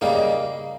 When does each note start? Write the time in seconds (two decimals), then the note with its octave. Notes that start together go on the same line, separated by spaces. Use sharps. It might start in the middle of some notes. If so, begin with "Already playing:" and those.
0.01 C#3 G3 A#3 D#4 F5
0.15 D#5